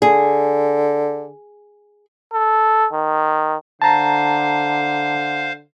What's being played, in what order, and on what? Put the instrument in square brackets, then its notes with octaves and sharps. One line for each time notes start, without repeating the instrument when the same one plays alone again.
[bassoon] D3 [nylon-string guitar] G#4
[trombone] A4
D#3
[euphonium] D3 [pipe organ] C5 F5 [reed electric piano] A5 A#5